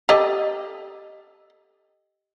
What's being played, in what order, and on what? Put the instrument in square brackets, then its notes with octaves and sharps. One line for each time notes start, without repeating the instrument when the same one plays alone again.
[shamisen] G4 A4 D#5